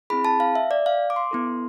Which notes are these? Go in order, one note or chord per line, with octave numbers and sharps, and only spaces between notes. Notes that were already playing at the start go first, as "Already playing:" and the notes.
C4 E4 G#4 B5
A5
F5
E5
D5
F5
D6
C6
B3 E4 A4